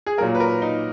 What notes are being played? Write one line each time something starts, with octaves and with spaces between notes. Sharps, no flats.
G#4
A#2 F#3 A#3 A#4
B4
A#4
D#4